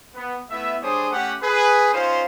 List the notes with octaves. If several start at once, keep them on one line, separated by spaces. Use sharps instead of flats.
B3
A3 B3 E4 E5
G3 D4 G#4 C5 C#5 D#6
A3 C#4 G4 F#5
G#4 B4
C#4 D#4 F4 C5